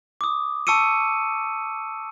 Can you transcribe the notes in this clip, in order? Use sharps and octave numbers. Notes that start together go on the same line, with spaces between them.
D6 D#6
A5 C#6 E6 C#7 D#7